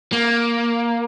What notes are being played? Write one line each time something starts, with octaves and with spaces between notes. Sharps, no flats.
A#3